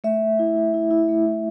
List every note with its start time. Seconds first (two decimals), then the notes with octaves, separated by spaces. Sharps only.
0.04 A3 E5
0.22 A3
0.39 E4
0.56 E4
0.74 E4
0.91 E4
1.09 A3
1.26 E4